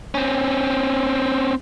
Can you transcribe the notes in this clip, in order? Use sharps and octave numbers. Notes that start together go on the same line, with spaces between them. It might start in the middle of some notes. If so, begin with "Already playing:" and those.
C4 C#4